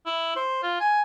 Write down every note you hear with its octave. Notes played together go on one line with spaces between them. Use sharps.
E4
C5
F4
G#5